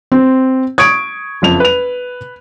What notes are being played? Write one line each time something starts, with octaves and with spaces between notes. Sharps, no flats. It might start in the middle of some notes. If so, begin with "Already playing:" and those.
C4
C#6 D#6 G#6 D7
F#1 F2 F7
B4 F7